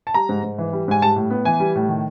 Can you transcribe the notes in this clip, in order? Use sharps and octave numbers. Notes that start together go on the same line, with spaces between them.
A5
G3 A#5
G#2
G#2
E3
G3
G#2 G#5
G3 A5
A2
B3
E3 G#5
G3
A2
D#3